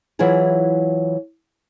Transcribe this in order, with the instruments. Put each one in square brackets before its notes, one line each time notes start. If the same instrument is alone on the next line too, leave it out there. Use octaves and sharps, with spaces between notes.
[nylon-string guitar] E3 F#3 E4 F4 G#4